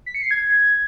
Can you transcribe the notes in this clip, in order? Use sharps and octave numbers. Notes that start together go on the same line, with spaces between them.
B6
C#7
C7
G#6